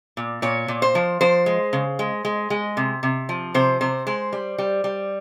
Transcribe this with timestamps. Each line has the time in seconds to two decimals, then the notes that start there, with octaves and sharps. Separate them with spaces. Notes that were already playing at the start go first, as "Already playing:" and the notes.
0.17 A#2
0.42 A#2 C#5
0.68 A#2
0.82 C5
0.95 F3
1.21 F3 C5
1.46 G#3
1.73 C#3
1.99 G#3
2.25 G#3
2.50 G#3
2.77 C3
3.03 C3
3.29 F3
3.54 C3 C5
3.81 C3 C5
4.07 G#3 C5
4.33 G3
4.58 G3
4.84 G3